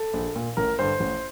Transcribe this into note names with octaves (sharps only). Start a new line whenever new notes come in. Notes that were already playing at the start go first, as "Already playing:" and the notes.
Already playing: A4
A#1
A#2
A1 A#4
G2 D3 C5
A1